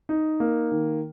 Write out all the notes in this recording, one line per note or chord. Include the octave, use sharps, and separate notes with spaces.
D#4
A#3
D#3